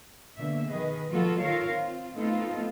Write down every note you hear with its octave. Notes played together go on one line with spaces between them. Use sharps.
B2 D3 A#3 E5
D#3 G#4 B4 D#5
F3 G#3 B3 F4 F#4 A4
D#3 F4 A4 A#4 C#5 F5
C4 F4
A3 B3 C4 D#4 F4 A4